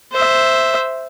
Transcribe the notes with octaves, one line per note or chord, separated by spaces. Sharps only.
C5 E5